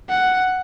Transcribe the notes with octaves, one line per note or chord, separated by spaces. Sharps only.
F#5